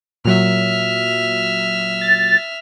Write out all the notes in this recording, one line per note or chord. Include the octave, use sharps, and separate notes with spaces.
A#2 F#3 E5 F6
A6